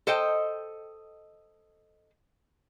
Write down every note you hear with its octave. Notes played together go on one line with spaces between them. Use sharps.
A4 C5 D#5 G5